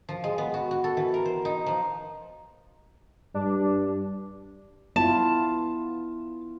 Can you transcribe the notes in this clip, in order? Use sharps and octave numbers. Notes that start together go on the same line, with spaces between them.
F3
G#3
B3
F#4
F#4
A4
E3
A#4
C5
D#4
F3
G2 D4
B3 E4 F4 A5